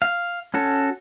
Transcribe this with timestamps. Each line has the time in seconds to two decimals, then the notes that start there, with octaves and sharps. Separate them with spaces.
0.02 F5
0.54 C#4 F#4 A4